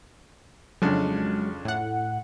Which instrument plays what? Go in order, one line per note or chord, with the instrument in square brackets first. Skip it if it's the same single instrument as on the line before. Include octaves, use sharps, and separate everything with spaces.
[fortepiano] F2 C#3 D4 [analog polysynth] F#3 G#3
[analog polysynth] A2 F#5